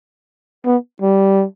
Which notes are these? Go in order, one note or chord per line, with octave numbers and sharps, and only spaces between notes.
B3
G3